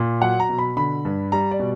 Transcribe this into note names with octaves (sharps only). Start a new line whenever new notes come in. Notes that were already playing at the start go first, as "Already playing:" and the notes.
Already playing: A#2
F#3 F#5
A#5
B2
B5
D3 B5
G2
G3 A#5
D5
B2